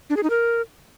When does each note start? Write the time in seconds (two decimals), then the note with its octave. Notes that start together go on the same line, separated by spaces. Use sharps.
0.10 D4
0.16 G#4
0.23 D#4
0.30 A#4